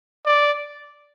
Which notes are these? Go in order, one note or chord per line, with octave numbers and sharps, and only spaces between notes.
D5